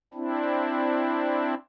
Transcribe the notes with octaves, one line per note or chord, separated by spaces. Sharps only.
C4 D4 E4